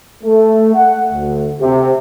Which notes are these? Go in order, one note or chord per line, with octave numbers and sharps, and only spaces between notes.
A3
F#5
D2
C3